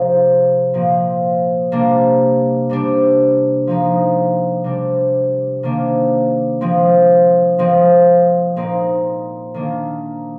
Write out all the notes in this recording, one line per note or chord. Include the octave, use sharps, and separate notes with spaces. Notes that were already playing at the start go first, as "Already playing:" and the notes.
Already playing: C3 F3 G#3 C4 D#4
A#2 F3 C4
C3 G3 A#3 D4
C3 G3 D4
F3 G#3 D#4
C3 G3 D4
C3 D#3 A#3 D4
F3 G#3 C4
F3 G#3 C4
A#2 G#3 C4 D#4
D#3 A#3 D4